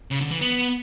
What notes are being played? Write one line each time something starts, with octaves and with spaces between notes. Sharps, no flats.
C#3
D3
E3
B3